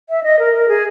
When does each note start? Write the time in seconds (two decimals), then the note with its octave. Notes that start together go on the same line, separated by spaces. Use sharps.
0.10 E5
0.24 D#5
0.39 A#4
0.53 A#4
0.68 G#4